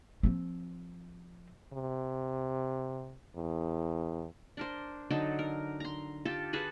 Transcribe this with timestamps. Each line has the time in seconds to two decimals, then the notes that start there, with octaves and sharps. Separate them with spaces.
0.23 F3 C4
1.73 C3
3.36 E2
4.57 D4 A#4 C5
5.10 D3 F#3 D#4 A4
5.39 A#4
5.80 A#5 C6
6.25 F4 G4 A4
6.53 F#4 G#4 A4 B4